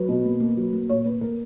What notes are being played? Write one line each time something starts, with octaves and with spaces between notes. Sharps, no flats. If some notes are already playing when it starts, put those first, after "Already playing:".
Already playing: F#3 B4
B2
A#3
A#3
F#3
A#3
A#2 C#5
A#3 B4
A#3 A#4